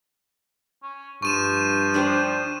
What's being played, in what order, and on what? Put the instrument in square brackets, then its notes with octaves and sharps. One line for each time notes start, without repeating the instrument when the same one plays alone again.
[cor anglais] C#4
[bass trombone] G2 [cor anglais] F3 [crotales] C#6 D#7 E7
[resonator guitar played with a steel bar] D4 G4 C5